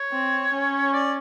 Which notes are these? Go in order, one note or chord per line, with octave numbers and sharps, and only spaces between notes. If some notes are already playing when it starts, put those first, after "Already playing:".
Already playing: C#5
C4
C#4
D5